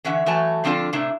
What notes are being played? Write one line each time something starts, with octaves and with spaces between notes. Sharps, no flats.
D3 E3 C#4 E5 F#5
E3 F#3 A3 G#5 A5
D3 F3 C4 D4 F4 A4
A2 C3 D4 E4